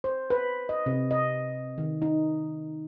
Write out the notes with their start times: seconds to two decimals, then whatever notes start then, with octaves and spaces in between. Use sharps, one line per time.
0.04 C5
0.30 B4
0.69 D#5
0.86 C3
1.11 D#5
1.78 D#3
2.02 D#4